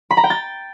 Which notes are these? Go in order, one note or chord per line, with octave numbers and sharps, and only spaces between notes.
B5
A#5
G5
A6